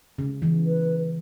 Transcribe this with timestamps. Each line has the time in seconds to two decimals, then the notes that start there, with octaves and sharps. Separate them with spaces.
0.18 C#3
0.42 E3
0.67 B4